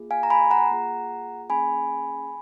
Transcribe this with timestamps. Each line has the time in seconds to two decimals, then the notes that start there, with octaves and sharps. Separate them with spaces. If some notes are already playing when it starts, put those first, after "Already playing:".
Already playing: A#3 F4 G#4
0.11 F5 G#5
0.23 A#5
0.30 G#5 B5
0.51 F#5 A#5
0.71 A#3 F4 G#4
1.49 A#3 C#4 G#4 G#5 B5